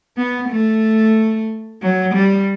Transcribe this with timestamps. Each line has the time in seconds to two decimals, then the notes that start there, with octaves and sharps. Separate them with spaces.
0.17 B3
0.49 A3
1.82 F#3
2.15 G3